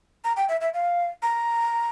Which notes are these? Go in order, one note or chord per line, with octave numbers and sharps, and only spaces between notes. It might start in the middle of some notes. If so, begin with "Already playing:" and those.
A#5
G5
E5
E5
F5
A#5